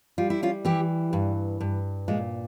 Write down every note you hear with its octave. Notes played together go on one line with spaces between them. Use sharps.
G3 F4
E4
C#4 F4
E3 E4 G4
G2
G2
A#2 G#3